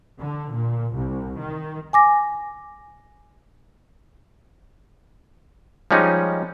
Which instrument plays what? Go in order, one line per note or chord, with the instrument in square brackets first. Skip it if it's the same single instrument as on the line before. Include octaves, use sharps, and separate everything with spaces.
[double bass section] D3
A#2
C2
D#3
[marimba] G#5 D6 A#6
[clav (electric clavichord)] F3 G3 G#3 C#4 D#4